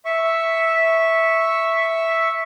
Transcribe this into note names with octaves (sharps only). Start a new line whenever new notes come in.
E5 C#6